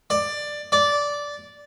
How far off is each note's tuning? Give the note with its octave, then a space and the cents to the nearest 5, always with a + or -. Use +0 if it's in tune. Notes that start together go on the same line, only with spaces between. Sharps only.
D5 +15
D5 -10